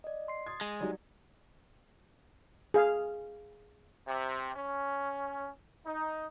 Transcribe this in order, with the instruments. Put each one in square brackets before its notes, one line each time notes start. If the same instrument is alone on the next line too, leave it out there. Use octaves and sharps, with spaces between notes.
[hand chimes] D5 D#5
C6 C7
[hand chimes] C6 D#6 A6 [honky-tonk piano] G#6
[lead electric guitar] G#3
[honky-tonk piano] F#3 G3 D#4 [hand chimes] D5
[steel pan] G#4 F5
[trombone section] C3
C#4
D#4